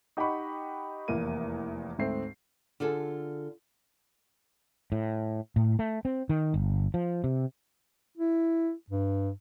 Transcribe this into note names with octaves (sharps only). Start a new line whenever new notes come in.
D#4 G4 D#5 F#5 B5 C#6
F1 E2 A#3 D#7
D2 G#2 A3 C4 C7
D3 F4 G#4 A4
A2
A2
A3
C4
D#3
G1
F3
C3
E4
G2